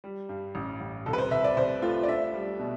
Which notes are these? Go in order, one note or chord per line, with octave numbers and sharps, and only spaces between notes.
G3
G2
A1
A1
C2 A4
B4
C5
C2 E5
D5
C2 C5
A3 F4
D5
D4 E5
G3
B2